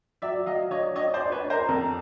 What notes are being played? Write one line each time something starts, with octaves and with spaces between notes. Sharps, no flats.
F#3 D5 E5
F#3 D#5 F5
D4 C#5 D#5
D4 C#5 D#5
C5 D5
D4
B4 C#5
D4
A#4 C5
F2 A#4